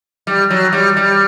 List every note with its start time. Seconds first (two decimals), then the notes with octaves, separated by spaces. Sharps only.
0.27 G3
0.50 F#3
0.73 G3
0.97 G3